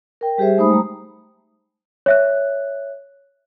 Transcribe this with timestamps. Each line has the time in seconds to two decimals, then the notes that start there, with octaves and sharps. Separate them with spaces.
0.21 A#4 G5
0.38 G3 G4 G#4 C5 E5
0.58 G#3 A3 D#4 C5 B5 D#6
0.70 G3 A3 A#5
2.06 C#5 E5 F#6